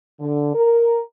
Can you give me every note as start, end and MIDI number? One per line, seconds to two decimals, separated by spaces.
0.20 0.52 50
0.54 1.01 70